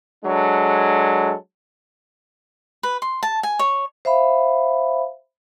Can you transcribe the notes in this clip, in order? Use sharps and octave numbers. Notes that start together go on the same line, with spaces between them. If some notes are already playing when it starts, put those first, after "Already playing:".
F#3 G#3 D4 A4
B4
C6
A5
G#5
C#5
C5 E5 F5 B5